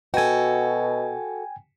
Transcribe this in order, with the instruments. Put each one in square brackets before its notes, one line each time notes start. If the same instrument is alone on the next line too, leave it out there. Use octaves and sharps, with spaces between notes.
[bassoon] B2 [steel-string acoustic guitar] F#4 A4 [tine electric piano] G5 G#5